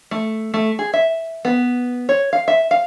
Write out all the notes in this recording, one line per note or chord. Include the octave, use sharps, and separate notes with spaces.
A3
A3
G#4
E5
B3
C#5
F5
E5
F5